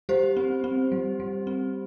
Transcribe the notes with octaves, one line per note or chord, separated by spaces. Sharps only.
G3 G4 C5
C4
C4
G3
G3
C4